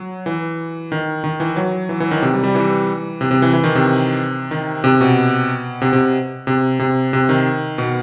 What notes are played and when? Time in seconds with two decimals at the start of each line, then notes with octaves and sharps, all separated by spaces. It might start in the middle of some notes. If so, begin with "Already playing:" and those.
Already playing: F#3
0.26 E3
0.92 D#3
1.24 D#3
1.40 E3
1.56 F#3
1.89 E3
2.00 E3
2.11 D#3
2.22 C3
2.33 G3
2.44 G3
2.55 E3
3.21 C3
3.31 C3
3.42 E3
3.53 E3
3.64 D#3
3.75 C3
4.51 D#3
4.84 C3
5.01 B2
5.82 C3
5.93 C3
6.47 C3
6.79 C3
7.13 C3
7.29 D#3
7.78 B2